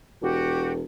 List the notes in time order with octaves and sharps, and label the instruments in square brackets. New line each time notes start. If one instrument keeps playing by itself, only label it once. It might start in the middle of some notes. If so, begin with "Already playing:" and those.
[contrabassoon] E1 [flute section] F#4 G4